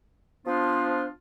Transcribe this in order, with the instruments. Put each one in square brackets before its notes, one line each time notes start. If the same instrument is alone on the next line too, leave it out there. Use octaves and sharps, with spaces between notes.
[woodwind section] F3 B3 D4 F4 C5